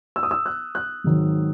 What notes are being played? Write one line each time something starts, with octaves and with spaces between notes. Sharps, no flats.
E6
D#6
E6
F#6
F#6
G#1 G#2 D#3 F#3